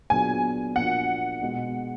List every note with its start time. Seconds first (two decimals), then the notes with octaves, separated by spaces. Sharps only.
0.10 A#2 F#3 B3 D4 G#4 G#5
0.76 A#2 F3 A#3 D4 F#4 F#5
1.42 B2 G#3 D#4 G#4